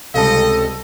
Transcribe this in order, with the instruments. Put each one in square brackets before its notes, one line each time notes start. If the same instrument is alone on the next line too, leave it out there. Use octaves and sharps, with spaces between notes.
[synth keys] C#2 C3 G3 [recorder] A4 [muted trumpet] D#5 [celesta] F5 A5